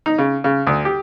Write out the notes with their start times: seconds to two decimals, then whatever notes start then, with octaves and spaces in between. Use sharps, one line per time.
0.06 D#4
0.18 C#3
0.44 C#3
0.67 D2
0.85 G4